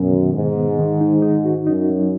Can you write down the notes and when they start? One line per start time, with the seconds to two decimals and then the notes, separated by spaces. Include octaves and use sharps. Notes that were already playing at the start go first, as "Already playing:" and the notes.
Already playing: F#2 B2 B3
0.12 D#3
0.33 G#2 D#3
0.55 B3
0.79 D#3
1.01 D#4
1.22 D#4
1.44 F#4
1.67 F#2 D#4
1.90 F#3